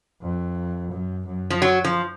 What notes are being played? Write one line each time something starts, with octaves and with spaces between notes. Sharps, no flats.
F2
F#2
F#2
F3
F#3
F3